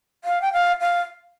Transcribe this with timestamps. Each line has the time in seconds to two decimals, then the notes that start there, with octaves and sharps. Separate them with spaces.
0.24 F5
0.42 G5
0.53 F5
0.81 F5